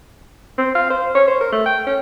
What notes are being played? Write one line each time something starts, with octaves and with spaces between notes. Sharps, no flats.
C4
F5
C5
C#5
C5
A#4
A3
G5
C#4